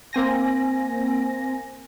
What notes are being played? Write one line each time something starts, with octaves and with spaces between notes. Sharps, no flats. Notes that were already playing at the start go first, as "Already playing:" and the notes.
A#3 C4 G#5 A#6